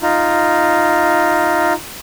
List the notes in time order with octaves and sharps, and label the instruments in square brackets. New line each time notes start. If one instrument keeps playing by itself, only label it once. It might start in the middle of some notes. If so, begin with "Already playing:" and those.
[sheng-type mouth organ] D#4 F4